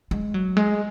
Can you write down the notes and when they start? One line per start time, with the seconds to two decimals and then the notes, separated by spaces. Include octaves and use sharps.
0.11 G#3
0.34 F#3
0.57 G#3